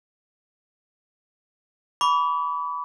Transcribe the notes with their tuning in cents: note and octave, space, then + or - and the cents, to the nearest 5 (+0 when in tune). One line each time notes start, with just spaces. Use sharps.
B5 +0 D6 -45